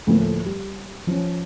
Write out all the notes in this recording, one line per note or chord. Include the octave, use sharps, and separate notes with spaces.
D2 A2 F3 A#3
G3
F3 C#4